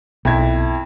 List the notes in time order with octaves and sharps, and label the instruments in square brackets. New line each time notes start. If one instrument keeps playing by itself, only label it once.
[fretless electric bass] B1 [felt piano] F2 E4 G#6